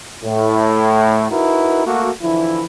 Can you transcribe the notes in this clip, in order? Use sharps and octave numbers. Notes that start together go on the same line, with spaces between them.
A2
D#4 E4 F#4 A#4 B4
A3 A#3 F#4
D3 E3 F3 E4